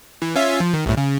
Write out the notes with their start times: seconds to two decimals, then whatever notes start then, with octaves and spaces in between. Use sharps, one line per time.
0.22 E3
0.36 C#4 F4 E5
0.60 F3
0.74 D#3
0.86 C2 A2
0.97 C#3